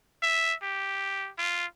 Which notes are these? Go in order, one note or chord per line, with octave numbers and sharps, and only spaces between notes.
E5
G4
F4